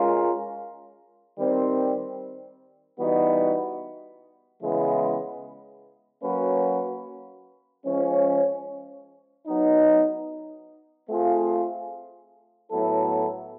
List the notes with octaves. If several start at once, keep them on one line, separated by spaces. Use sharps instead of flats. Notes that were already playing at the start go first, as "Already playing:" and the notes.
Already playing: G#3 C#4 F4 A#4
D#3 G3 C4
E3 G3 B3 D#4 F#4
C#3 E3 G#3 B3 E4
F#3 A#3 C#4 F#4 B4
F3 G#3 C#4
F#3 B3 D#4
A3 C4 F4 G#4
A2 F#3 B3 E4 A4